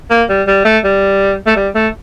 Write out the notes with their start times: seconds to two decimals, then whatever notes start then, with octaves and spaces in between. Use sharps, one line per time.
0.10 A#3
0.29 G3
0.47 G3
0.65 A3
0.84 G3
1.46 A3
1.56 G3
1.75 A3